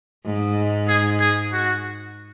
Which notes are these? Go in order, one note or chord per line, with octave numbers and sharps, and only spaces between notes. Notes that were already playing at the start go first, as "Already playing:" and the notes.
G#2
G#4
G#4
F#4